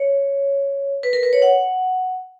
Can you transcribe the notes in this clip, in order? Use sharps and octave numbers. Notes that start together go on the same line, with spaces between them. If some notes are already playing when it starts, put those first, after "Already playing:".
Already playing: C#5
B4
A#4
B4
C#5
F#5